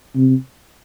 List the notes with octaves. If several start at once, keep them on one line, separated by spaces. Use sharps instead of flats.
C3